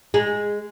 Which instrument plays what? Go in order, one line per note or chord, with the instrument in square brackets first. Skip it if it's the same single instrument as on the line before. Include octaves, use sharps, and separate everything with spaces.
[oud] G#3